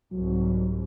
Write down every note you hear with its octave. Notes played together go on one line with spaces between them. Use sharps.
C2 G#2 F#3